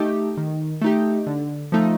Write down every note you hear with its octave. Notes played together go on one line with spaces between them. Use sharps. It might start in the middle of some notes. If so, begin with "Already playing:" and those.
Already playing: A3 D#4 G4
D#3
A3 D#4 G4
D3
F3 A3 D#4